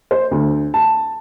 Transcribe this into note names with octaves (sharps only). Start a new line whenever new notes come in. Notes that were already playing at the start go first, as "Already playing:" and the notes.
C5
D2
A5